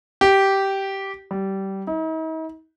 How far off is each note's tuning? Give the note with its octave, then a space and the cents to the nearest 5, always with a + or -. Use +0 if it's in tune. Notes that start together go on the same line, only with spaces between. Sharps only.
G4 -10
G3 -20
D#4 +45